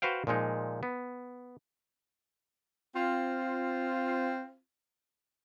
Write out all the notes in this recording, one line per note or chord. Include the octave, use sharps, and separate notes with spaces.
F#4 B4 C5 F5 G5
A#2 F3 G#3 D#4
B3
C4 F4